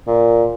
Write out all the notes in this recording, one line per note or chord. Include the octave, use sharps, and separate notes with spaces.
A#2